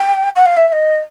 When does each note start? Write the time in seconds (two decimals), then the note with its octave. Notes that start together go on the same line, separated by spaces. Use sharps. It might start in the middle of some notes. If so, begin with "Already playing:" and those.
Already playing: G5
0.36 F#5
0.46 F5
0.57 E5
0.68 E5
0.72 D#5